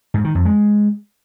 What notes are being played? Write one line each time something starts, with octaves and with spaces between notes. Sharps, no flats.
G#2
D#3
F2
G#3